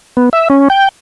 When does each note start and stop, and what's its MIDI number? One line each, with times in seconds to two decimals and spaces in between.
0.17 0.29 59
0.33 0.48 76
0.50 0.68 61
0.70 0.89 79